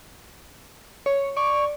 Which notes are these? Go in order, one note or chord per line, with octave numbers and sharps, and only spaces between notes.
C#5
D5 C#6